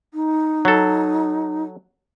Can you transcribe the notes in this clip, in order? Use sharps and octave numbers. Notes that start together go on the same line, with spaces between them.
D#4
F#3 A4